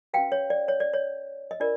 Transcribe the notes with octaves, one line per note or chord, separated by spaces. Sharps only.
C#4 F#4 B4 F5 G5
C#5
D5
C#5
D5
C#5
D#5
D4 F4 A#4 D5